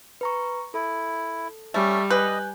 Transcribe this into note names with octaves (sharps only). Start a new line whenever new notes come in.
B4 A#5 C#6
E4 A4
G3 A3 C#4
B4 D#5 G#5 F#6 G6